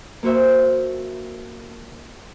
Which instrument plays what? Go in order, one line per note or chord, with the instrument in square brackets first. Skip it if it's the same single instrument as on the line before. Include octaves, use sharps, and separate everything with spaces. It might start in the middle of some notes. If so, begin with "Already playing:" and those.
[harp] A#3 F4 F#4 C5 E5